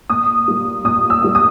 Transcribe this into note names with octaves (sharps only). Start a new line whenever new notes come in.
A#2 D#6
G3 A#3
A#2 D#6
E6
G3 A#3
D#6